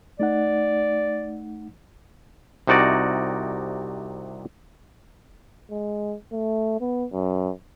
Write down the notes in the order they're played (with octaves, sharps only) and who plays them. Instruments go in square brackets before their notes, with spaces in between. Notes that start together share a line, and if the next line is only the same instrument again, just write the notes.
[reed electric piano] A3 D#4 F#5 [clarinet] D5
[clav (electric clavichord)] C2 C3 D#4 F#4 D5
[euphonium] G#3
A3
B3
F#2